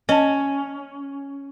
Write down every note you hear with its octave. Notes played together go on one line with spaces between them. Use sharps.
C#4 D#5 A5